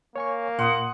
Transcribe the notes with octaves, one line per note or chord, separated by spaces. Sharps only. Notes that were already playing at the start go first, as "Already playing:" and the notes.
A#3 C#5 G#5 C#6
A#2 F#5 C6 D#6